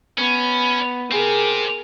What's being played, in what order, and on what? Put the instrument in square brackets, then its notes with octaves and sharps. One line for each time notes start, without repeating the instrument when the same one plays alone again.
[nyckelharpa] B3 [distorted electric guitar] C#4
[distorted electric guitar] C4 G4 [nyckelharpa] G#4 A#4